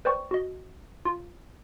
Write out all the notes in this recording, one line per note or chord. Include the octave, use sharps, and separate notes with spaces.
B4 C5 D5 G5 C#6
F#4 D#5
F4